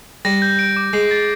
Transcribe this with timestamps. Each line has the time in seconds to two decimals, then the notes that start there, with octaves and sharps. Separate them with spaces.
0.25 G3 A#6
0.42 G6
0.59 D7
0.76 D6
0.93 G#3 C7
1.11 A6